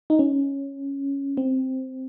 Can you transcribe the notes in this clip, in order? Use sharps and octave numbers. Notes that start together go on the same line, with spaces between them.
D#4
C#4
C4